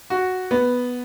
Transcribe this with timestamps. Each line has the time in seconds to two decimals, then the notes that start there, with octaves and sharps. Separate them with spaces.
0.10 F#4
0.51 B3